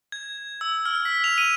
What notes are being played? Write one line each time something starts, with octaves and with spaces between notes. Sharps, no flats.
G#6
E6
F6
B6
F7
D#7